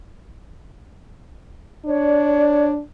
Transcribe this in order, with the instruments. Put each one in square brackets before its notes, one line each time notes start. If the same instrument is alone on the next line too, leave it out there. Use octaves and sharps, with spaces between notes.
[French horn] D4 [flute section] C#5 D5